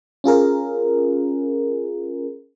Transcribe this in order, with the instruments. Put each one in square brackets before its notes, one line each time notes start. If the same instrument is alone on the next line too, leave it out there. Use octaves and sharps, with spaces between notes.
[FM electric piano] C#4 F4 G#4 A#4